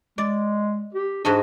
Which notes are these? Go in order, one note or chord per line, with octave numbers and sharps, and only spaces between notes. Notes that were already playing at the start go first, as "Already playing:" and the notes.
G#3 D5
G4
G#2 D4 F#4 D#5